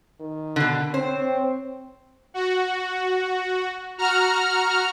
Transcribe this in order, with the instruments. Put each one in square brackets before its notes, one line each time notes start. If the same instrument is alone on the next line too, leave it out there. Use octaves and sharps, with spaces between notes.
[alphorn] D#3
[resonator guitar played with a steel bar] B2 D3
[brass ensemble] C4 [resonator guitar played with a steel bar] C5 [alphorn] C#5
[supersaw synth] F#4
F#4 A#5 F6